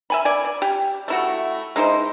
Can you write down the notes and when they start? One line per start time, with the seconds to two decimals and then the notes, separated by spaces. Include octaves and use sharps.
0.10 E5 G#5 B5
0.25 D5 G#5
0.45 D5
0.62 G4
1.08 A3 E4 F#4
1.76 G#3 D#4 E4 C5